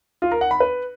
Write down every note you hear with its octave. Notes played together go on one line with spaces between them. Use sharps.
F4
A#4
F#5
B5
B4